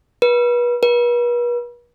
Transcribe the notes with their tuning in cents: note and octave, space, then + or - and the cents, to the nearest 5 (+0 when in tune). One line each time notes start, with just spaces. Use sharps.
B4 -35
B4 -40